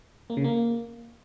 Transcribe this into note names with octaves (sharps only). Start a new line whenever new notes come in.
A#3
C#3
A#3